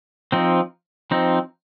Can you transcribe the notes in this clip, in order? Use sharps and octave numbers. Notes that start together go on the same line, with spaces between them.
F3 C4 D#4
F3 C4 D#4